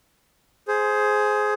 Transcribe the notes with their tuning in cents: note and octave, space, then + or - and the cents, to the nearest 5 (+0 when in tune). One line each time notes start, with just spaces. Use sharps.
G#4 +15 C5 +0